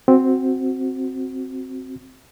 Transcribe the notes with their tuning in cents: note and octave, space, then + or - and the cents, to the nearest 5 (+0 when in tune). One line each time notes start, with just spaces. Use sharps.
C4 +0 F#4 +0